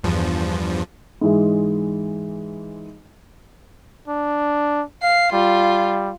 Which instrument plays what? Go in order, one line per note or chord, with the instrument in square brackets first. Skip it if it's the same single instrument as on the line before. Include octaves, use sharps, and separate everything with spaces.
[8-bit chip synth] E2 G2 F3
[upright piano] G#2 E3 G#3
[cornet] D4
[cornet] F5 [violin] C7
[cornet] G3 [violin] F4